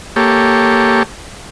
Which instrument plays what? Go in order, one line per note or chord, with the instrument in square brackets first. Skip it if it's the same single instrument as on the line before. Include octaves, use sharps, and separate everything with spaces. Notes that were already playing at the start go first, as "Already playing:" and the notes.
[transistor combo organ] A#3 G4 A4 C#5